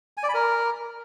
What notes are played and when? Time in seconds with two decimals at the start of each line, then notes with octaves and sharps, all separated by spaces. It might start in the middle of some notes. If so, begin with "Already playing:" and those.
0.17 G#5
0.23 D5
0.29 B5
0.34 A#4